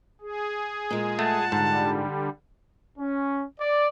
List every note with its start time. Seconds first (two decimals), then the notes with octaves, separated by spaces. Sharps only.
0.21 G#4
0.91 A#2 G#3
1.19 A3 F#5 A5
1.52 G#2 D3 G3
2.98 C#4
3.60 D5